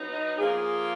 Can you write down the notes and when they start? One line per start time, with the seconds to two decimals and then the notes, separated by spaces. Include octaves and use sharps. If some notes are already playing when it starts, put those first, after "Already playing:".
Already playing: F#3 B3 D#4
0.13 D#5
0.37 F3 A#3 F4 G#4